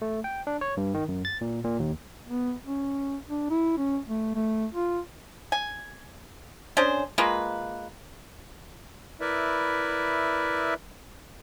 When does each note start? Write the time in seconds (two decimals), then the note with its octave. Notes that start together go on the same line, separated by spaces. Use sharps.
0.02 A3
0.24 G5
0.47 D4
0.61 C#5
0.77 G2
0.94 D#3
1.08 F#2
1.25 A6
1.41 A#2
1.64 A#2
1.80 D#2
2.27 B3
2.66 C#4
3.28 D4
3.50 E4
3.77 C#4
4.08 A3
4.35 A3
4.74 F4
5.52 G#5
6.77 C#4 D4 G#4 C5
7.18 G#3 A#3 F4 B4
9.21 E4 A#4 B4 D5 E5